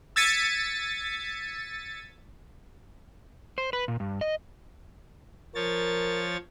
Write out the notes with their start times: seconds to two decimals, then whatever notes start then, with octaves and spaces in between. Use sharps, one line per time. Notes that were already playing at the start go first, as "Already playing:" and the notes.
0.16 E6 G#6 A6 B6 C#7 D#7
3.58 C5
3.73 B4
3.88 A#2
4.00 G2
4.21 D#5
5.55 F3 A#4 C#5 A6